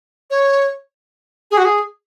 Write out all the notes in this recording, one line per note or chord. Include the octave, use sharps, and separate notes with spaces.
C#5
G#4
F#4
G#4